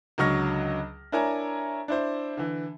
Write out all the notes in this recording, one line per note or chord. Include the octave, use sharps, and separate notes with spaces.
C#2 D3 F#3 C#6 F6 A#6
D4 E4 A#4 C#5 G#5 A#5
D4 E4 C5
D3 E3